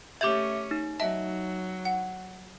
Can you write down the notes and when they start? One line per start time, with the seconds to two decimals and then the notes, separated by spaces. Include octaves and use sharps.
0.21 A3 C#4 G4 E5 D6 G6 G#6
0.71 D#4
1.00 F#3 D#5 E5 A5
1.85 F#5